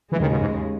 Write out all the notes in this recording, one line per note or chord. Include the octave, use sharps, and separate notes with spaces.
D#2 C#3 E3 G#3
D#3
B2
G#2